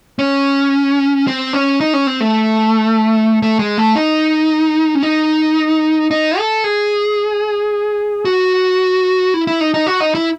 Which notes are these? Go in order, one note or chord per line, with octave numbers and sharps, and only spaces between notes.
C#4
C4
C#4
D#4
C#4
C4
A3
A3
G#3
A3
D#4
C#4
D#4
D#4
A4
G#4
F#4
E4
E4
D#4
D#4
F#4
D#4
E4